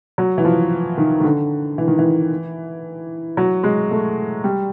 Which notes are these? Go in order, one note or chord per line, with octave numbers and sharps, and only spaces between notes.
F#3
E3
F3
D#3
D#3
D3
E3
D#3
E3
F#3
G#3
A3
G3